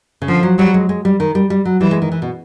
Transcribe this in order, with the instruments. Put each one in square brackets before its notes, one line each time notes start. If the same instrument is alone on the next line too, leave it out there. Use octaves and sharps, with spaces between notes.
[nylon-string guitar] C#3
[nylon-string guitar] D3 [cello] F3
[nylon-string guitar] F#3
[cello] F#3 [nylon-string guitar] G3
[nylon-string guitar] G#3
G#3
G3
D#3
G3
G3
F#3
[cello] E3 [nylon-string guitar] G3
[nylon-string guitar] G#3
D#3
E3
B2